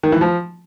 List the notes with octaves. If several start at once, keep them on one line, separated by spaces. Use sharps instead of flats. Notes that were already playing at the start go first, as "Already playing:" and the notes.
D#3
E3
F3